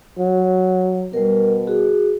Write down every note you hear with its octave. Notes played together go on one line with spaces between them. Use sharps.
F#3
B2 G3 A#4
F#4 G#4